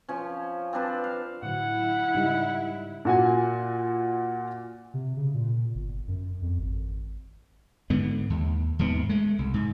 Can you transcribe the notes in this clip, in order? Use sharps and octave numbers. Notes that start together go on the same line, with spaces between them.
F3 C#4
C4 D4 B4 A5
F5
A2 D3 F#3 E4 F#5
G#2 C#3 G3 D#4 E5
A#2 F#4 G#5
C3
C#3
A#2
G1
F#2
F2
G#1
G#2 D3 B3
D#2
D#2 G#2 C3 B3
G#3 A3
C2
G#2